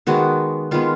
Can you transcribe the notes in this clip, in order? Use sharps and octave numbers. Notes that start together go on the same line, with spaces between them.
D#3 G#3 B3 F#4
D#3 G#3 B3 F4